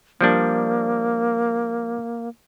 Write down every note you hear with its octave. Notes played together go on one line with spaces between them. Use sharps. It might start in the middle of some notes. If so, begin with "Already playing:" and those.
F3 G3 A#3 D4